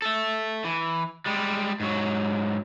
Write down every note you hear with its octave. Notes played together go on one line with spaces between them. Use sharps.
A4 E5
E3
G3 G#3
G#2 F#3